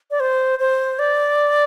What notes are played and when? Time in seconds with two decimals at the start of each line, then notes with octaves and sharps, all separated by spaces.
0.11 D5
0.20 C5
0.59 C5
0.99 D5